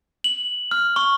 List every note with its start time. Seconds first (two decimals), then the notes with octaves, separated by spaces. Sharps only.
0.24 F#7
0.71 F6
0.96 C#6